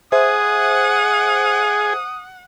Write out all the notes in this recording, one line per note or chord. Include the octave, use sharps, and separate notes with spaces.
G#4 C5 E5 F#5 D#6